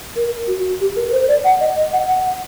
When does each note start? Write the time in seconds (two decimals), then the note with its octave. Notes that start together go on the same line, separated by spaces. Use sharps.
0.16 A#4
0.47 F#4
0.81 G4
0.96 A#4
1.08 A#4
1.12 C5
1.28 D5
1.44 F#5
1.60 D#5
1.76 D#5
1.93 F#5
2.08 F#5